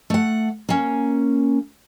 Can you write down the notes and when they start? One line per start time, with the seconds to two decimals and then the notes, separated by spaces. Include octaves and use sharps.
0.10 A3 F#5
0.69 A#3 C#4